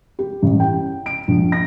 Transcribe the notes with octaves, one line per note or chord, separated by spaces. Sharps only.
G4
A1
G5
D7
A#1
A#6